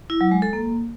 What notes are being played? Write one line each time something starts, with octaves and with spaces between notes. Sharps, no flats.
E4
F#3
G#3
A4
A#3